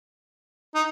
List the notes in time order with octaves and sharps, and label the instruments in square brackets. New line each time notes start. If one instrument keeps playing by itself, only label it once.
[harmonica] D#4